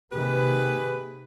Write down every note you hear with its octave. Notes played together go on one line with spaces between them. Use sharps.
C3 D#3 A#3 G4 G#4 B4